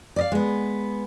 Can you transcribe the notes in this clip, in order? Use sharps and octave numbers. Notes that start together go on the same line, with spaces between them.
D5 D#5 F5
G#3 B3